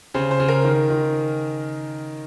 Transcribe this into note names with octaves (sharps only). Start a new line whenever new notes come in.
C#3 C5
C5
C#3
A#4
D#3
D#3